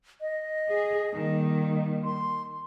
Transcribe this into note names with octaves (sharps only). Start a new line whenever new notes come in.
D#5
G#4
D#3 G3 A#3
C6